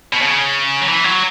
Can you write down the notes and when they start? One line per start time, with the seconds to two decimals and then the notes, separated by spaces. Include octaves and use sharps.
0.13 B2
0.21 C#3
0.81 F#3
0.88 E3
1.04 F#3